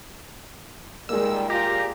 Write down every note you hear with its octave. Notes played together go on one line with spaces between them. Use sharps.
A#2 D#3 G3 G#3 A#3 E6
A#2 F4 G4 A#5